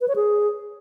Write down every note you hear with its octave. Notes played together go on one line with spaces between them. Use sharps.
B4
C#5
G#4